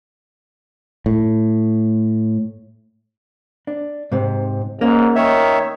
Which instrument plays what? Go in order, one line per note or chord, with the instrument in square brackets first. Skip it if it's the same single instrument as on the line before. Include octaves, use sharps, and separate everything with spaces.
[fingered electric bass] A2
[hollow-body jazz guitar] D4
G#2 C3
[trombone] G#2 [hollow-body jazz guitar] A#3 C#4
[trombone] D#3 [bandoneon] C#5 E5